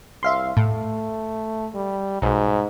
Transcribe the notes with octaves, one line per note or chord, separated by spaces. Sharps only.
C2 E5 F5 C6
A2 A3
G3
B1 G#2